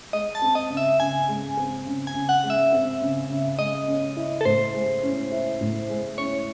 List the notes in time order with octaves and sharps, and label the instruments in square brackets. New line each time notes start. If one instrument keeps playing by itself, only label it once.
[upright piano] G#3 [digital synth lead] D#5
[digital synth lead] A5
[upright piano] C4
[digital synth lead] D#5
[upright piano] C#3
[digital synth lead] E5
[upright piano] C#3 [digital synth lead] G#5
[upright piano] G#3
C4
C#3
[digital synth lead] G#5
[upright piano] C#3
[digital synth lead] F#5
[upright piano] G#3
[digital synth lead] E5
[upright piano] C4
C#3
C#3
[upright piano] G#3 [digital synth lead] D#5
[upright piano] C#4
E4
[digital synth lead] A4
[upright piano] A2 [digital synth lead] C5
[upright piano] G#3
C#4
E4
A2
G#3
[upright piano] C#4 [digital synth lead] C#5